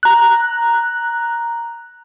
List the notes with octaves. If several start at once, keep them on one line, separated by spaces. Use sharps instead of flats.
A#5 F#6